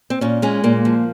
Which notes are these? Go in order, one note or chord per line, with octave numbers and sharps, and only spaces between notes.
C4
A#2 C#4
G#3 C#4
A#2 A#3
F3